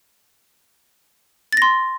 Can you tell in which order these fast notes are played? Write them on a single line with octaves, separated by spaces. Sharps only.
A6 A#6 C6